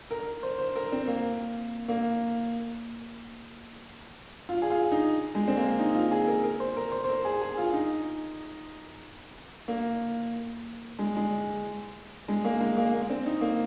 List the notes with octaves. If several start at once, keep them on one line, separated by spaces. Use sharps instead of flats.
A#4
C5
C5
A#4
C4
A#3
A#3
F4
G#4
F4
D#4
G#3
C4
A#3
D#4
F4
G#4
A#4
A#4
C5
A#4
C5
C5
A#4
G#4
G#4
F4
D#4
A#3
G#3
G#3
G#3
A#3
G#3
A#3
A#3
C4
D#4
A#3